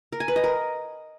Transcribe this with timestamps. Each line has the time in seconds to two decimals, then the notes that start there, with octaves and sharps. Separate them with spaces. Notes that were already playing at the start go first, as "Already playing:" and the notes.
0.12 A#4
0.20 G#5
0.28 B4
0.36 D#5
0.44 A#4